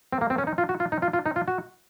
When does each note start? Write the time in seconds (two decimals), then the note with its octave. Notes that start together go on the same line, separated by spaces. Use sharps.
0.13 C4
0.21 A#3
0.30 C4
0.38 C#4
0.47 D#4
0.58 F4
0.69 F#4
0.80 F4
0.92 D#4
1.02 F4
1.13 F4
1.26 D#4
1.36 F4
1.48 F#4